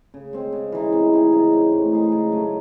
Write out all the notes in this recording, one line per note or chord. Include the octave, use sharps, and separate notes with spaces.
C#3
G#3 C4
C#3
E3 G#3 D#4
C3
E3 C4 D#4
C#3
G#3 C4
A2
G#3 D#4
C#3
F#3 A3 C#4